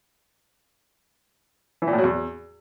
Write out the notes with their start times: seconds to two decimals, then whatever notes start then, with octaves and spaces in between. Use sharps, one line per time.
1.82 E3
1.87 A#2
1.93 A2
1.98 F#3
2.04 E2